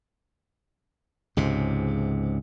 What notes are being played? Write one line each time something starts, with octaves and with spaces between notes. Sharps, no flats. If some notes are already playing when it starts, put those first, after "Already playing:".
C#2 G#2 C3